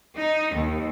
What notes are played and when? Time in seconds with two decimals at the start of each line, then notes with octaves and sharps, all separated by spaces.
0.17 D#4
0.55 D#2